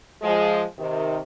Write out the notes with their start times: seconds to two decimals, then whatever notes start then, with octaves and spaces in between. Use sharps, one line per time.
0.22 F3 G#3
0.78 C3 D#3